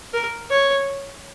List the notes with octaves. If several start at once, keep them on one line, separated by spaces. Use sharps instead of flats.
A#4
C#5